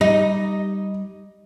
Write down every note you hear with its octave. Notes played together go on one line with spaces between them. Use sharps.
G3 D#4 D#5